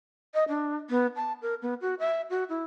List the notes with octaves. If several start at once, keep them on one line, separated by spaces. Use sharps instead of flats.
D#5
D4
B3
A5
A#4
B3
F#4
E5
F#4
E4